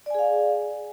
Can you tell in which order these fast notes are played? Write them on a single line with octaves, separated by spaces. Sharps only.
D5 G#5 G#4 F5